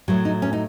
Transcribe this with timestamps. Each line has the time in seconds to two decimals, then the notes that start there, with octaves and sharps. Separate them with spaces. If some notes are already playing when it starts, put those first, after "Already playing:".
0.08 A2 F#3 A3
0.25 D#4
0.42 C#4
0.53 D#4